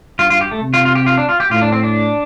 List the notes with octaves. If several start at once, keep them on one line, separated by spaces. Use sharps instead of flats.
G2 F4
F4
G4
A3
C3
F4
F4
G4
F4
D4
F4
G4
A2 F4
D4
C4
D4